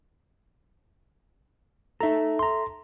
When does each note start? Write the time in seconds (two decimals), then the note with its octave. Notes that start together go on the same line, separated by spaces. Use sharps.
2.01 D#4 A4 E5 A#5
2.39 A#5 C6